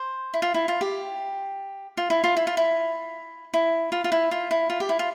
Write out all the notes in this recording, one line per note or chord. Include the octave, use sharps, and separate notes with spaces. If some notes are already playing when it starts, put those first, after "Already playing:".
Already playing: C5
E4
F4
E4
F4
G4
F4
E4
F4
E4
F4
E4
E4
F4
F4
E4
F4
E4
F4
G4
E4
F4